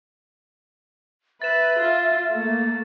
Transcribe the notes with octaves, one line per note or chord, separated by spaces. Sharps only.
B4 E5 A6 E7
F4
A3 A#3